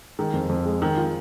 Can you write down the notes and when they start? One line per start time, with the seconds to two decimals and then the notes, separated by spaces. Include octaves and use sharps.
0.19 D#3 G#3
0.33 F2
0.49 F2
0.66 G#3
0.81 D#3 G#3
0.97 F4